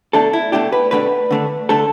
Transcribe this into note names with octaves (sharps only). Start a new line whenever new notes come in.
B2 A3 D4 A4
E4
B2 A3 D4 G4
B4
B2 A3 D4 B4
D3 A3 D4
D3 A3 D4 A4